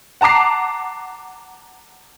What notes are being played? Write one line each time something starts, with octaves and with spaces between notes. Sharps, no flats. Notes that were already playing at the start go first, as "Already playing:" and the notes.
F#5 A5 A#5 D6 C7